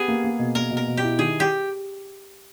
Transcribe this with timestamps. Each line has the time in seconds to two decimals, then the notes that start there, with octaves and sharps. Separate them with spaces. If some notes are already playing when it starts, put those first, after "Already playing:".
Already playing: B3 G4 G#4
0.08 A#3
0.24 A#3
0.39 B2
0.55 A#3 A#4
0.71 B2
0.77 A#4
0.87 B2
0.97 G4
1.03 E4
1.19 D#3 G#4
1.40 G4